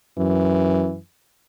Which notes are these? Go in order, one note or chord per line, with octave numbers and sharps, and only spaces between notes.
F#2 E3